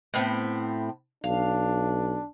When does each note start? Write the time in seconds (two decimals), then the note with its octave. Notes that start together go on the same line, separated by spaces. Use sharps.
0.14 A2 B3 C4
1.24 B1 D4 F5